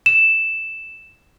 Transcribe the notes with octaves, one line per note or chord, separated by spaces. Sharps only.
E7